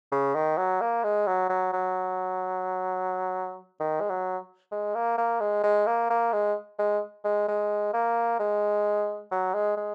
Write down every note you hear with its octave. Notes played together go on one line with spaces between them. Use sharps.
C#3
D#3
F#3
A#3
G#3
F#3
F#3
F#3
D#3
G#3
F#3
G#3
A#3
A#3
G#3
G#3
A#3
A#3
G#3
G#3
G#3
G#3
A#3
G#3
F#3
G#3
G#3